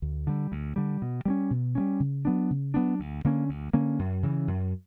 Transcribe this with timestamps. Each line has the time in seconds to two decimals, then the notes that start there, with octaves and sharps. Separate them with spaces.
0.02 D2
0.27 D3 G3
0.52 D2
0.76 D3 G3
1.02 B2
1.25 G3 A#3 C#4
1.50 B2
1.75 G3 A#3 C#4
2.00 C#3
2.25 F#3 B3 D4
2.50 C#3
2.74 F#3 B3 D4
3.00 D2
3.24 D3 A#3 C#4
3.49 D2
3.73 D3 A#3 C#4
3.99 F#2
4.23 C#3 E3
4.48 F#2